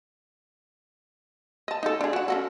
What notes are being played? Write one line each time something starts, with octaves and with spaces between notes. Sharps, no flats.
D#5 A5
D#4 A4
D4 G#4
F#4 F#5
C#4 F#4 A4